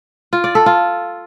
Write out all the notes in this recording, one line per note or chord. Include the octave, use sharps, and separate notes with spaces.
F4
D5
A4
F4